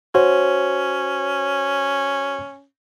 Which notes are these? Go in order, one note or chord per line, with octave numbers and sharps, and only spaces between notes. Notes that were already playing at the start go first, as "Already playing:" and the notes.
C#4 F#4 C5 C#5